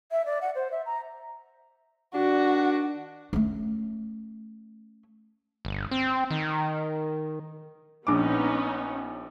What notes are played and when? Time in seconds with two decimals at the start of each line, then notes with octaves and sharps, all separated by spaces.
0.12 E5
0.26 D5
0.41 F#5
0.55 C5
0.71 E5
0.86 A#5
2.15 D#3 D4 F#4
3.33 A3 C#4
5.65 G1
5.91 C4
6.31 D#3
8.07 A#1 B3 C#4 D#4 D6